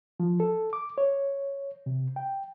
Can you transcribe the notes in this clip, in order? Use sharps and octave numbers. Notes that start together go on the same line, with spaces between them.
F3
A4
D6
C#5
C3
G5